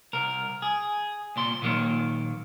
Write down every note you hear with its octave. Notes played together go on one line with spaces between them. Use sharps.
C2 A#4
G#4
C2 A#2 C6
A#2 D#3 F#3 A#3